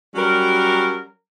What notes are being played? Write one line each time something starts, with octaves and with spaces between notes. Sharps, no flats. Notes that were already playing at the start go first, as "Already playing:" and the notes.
F#3 G3 C#4 A#4